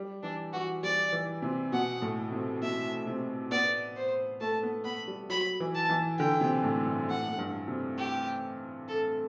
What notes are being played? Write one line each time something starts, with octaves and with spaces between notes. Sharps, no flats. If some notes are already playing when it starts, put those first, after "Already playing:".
Already playing: G3
E3 D4
E3 F#4
G3 D5
E3
C3
B2 F#5
A2
C3
B2 E5
C3
B3 D5
C5
A3 A5
B3
B3 B5
G3
F#3 B5
E3
A5
E3
D3 G5
C3
A2
G2
A2 F#5
A2
G2
C3
G4
A4